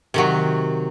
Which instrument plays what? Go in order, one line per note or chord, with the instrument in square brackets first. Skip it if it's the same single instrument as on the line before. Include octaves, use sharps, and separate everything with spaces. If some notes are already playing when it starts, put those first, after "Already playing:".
[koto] C3 D#3 F#3